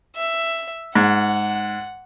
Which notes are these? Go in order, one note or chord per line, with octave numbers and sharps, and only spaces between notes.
E5
G#2 F#5